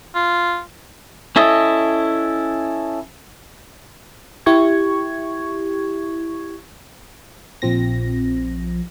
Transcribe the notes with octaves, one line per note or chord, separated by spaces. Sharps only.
F4
C#4 E4 A4 D#5
E4 G4 C#6 G#6
A#1 F3 C4 A#6